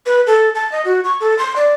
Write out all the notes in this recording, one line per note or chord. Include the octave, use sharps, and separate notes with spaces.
B4
A4
A5
D#5
F#4
C#6
A4
C6
D5